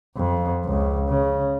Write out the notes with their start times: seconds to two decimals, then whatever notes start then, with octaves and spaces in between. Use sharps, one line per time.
0.17 F2
0.65 C#2
1.09 C#3